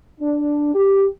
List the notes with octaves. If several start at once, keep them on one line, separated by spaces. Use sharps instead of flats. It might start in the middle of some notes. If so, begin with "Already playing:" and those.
D4
G4